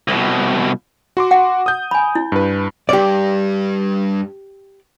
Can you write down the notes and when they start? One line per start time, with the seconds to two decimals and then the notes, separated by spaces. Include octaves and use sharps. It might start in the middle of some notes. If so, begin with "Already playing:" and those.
0.08 C2 B2
1.17 F#4 C6 D6
1.31 F#5
1.66 D#6 G6
1.91 G#5 B5
2.15 E4
2.32 G2 B4
2.89 G2 G4 D5